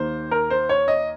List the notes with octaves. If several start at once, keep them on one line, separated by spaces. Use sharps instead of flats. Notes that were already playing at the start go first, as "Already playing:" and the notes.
Already playing: D#2 D#3 A#3 C5
A#4
C5
C#5
D#5